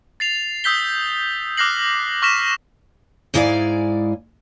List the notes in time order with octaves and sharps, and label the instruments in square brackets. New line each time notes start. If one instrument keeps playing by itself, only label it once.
[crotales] A6 C7 F7
D#6 E6 G6 B6 G7
D6 F6 F#6 A#6 C7 F#7
C#6 F6 A#6 B6 E7
[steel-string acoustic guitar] G#2 G#3 E4 D5 F5 G#5